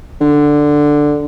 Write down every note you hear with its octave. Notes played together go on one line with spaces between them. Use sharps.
D3